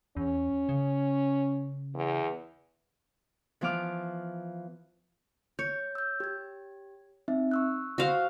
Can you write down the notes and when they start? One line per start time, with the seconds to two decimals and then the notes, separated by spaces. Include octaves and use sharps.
0.17 E2 C#4
0.69 C#3
1.94 E2
3.61 E3 F3 B3 F5 D6 F6
5.59 C#5 G6
5.95 E6 G6
6.20 G4 G#6
7.28 C4 D#4 E5
7.51 C#6 E6 F#6
7.98 F#4 C5 F5